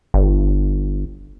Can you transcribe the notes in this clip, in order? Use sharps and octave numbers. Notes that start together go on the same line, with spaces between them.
G1